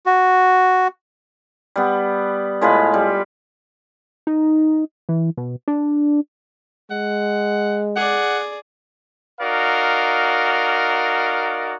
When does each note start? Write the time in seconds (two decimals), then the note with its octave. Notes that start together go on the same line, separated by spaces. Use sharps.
0.06 F#4
1.76 G3 B3
2.61 A2 G#3 F4 B4
2.94 G3
4.27 D#4
5.09 E3
5.37 B2
5.68 D4
6.91 G#3 F#5
7.96 G#4 D5 F#5
9.41 D#4 F#4 A#4 D5 F5